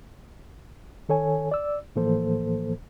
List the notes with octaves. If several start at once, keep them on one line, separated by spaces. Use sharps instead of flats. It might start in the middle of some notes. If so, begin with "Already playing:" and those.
D#3 A4 C#5 G#5
D5 E6
A2 E3 F3 A#3 A4 C5